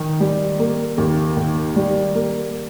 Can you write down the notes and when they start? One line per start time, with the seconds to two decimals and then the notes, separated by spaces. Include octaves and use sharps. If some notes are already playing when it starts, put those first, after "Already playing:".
Already playing: D#3
0.20 G3
0.59 A#3
0.98 D#2
1.37 D#3
1.76 G3
2.15 A#3